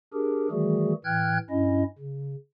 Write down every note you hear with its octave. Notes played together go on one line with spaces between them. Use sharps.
D4 G4 G#4 A#4
D#3 E3 G3 A3 F#4 G#4
A2 E3 G5 F6 F#6 G#6
G2 C#4 E4 D#5
C#3